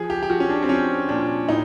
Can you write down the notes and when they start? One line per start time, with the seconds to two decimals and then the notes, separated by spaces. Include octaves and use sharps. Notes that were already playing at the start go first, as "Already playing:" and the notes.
Already playing: F3 G#4
0.10 G4
0.23 G4
0.30 F3 F#4
0.40 C#4
0.50 D4
0.63 C4
0.69 F3 C#4
1.09 A#2 D4
1.48 A2 D#4